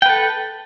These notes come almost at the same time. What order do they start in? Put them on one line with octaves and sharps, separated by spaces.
G5 B4 A4